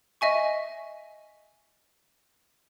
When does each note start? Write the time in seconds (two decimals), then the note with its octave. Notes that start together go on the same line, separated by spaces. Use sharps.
0.21 D#5 E5 G#5 C#6